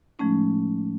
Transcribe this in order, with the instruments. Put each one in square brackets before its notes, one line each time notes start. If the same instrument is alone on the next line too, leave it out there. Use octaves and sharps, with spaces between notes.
[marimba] A2 F3 G#3 A3 C#4 D#4